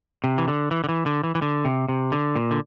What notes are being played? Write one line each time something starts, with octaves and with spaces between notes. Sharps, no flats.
C3
E3
D3
E3
D3
E3
D3
E3
E3
D3
C3
C3
D3
A#2
D3